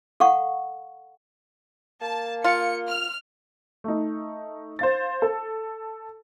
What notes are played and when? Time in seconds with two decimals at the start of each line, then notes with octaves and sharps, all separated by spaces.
0.20 A4 F5 F#5 C#6
2.01 A#3 A5
2.44 F4 C#7
2.88 F6
3.84 A3 D#4
4.79 C5 F5 A6
5.22 A4